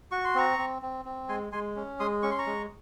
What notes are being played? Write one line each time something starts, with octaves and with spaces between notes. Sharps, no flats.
F#4 C#6
C6
C4 A#5 C#6
C4
C4
C4
G#3 G#5 C6
G#3 G#5 C6
C#4
G#3 C6 D#6
C#4 C#6
C6
A#5 C#6
G#3